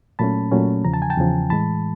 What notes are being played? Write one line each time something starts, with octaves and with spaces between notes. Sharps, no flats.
A#2 F#3 A3 C#4 A5 B5
A#2 F#3 A3 C#4
E2 C#3 F3 A#5
A5
G#5
G5 A5
E2 C#3 F3
A2 E3 G#3 A5 B5